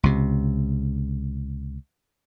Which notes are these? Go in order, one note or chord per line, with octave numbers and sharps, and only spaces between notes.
C#2 C3